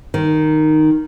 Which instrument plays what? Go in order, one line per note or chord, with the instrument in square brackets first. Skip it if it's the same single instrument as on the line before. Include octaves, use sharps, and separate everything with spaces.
[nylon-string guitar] D#3